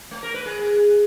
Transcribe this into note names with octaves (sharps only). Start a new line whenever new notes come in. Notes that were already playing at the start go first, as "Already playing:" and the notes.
A3
A#4
B4
G#4